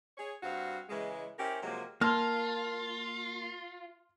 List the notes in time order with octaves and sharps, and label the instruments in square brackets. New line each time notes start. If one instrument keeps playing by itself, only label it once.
[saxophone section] G#4 C#5
G2 C4 F#4 F5
C#3 E3 G#3
C#4 E4 G4 A#4 C5
C3 F3 F#3 G#3 A#3
[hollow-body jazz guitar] A#3 [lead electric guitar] F4 [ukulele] A5 [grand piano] C6 F6